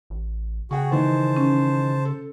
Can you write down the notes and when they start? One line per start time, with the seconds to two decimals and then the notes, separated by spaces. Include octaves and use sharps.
0.10 A1
0.71 C#3 F#4 G#4 F#5 G5 C#6
0.91 D#3 E3 D#4 C5 A5
1.37 C#4
2.05 A4